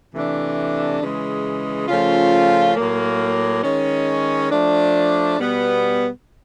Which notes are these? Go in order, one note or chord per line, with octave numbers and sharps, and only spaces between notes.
C3 E3 A3 D4
C#3 E3 G#3
C#3 F3 A3 C#4 F4
A2 F#3 A#3
D#3 G#3 C#4
F3 A3 D4
B2 G3 B3